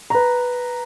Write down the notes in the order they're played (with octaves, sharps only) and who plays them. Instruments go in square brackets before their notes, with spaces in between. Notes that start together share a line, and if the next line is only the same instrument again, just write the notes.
[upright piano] B4 A#5